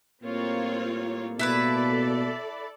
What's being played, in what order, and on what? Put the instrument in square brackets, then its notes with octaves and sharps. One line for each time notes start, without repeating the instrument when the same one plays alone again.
[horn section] A2 G3 A#3 [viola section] C4 F4 C#5
[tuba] B2 [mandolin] E4 B4 E5 [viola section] A4 D5